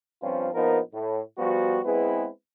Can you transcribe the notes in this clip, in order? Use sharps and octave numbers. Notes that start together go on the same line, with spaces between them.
G2 F3 C4 C#4 F4
A#1 F3 B3 D#4 A#4
A2
F3 G3 B3 F#4
G#3 B3 C4 E4 G#4 B4